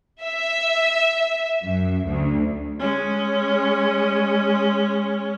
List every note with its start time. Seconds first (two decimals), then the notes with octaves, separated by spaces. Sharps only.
0.23 E5
1.64 F#2
2.07 D2
2.79 G#3 C#4